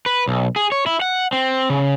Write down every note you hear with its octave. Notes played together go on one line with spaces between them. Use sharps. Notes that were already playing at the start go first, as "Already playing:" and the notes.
B4
B1
G#4
C#5
E4
F#5
C4
C#3